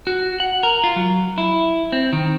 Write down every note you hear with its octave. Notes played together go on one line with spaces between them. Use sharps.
F#4
F#5
A#4
F4
F#3
E4
C4
D#3